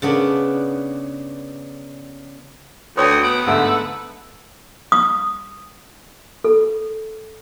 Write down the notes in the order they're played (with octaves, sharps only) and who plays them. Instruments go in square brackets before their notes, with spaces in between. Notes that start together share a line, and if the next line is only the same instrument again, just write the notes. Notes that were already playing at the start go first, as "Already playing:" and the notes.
[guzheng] C#3 B3 D4
[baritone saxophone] D2 [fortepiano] B4 C#5 G5 [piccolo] D#6
[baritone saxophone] B3 [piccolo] D7
[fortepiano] G#2 D3 A3 [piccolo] E6
[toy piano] D#6
A4